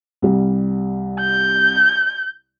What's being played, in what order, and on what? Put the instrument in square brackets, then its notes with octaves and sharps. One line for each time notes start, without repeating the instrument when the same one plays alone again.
[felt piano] C2 G3
[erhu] G6